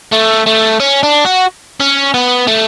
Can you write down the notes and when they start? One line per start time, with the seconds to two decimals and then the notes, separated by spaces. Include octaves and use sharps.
0.13 A3
0.47 A3
0.80 C#4
1.03 D4
1.25 F#4
1.80 C#4
2.14 B3
2.47 A3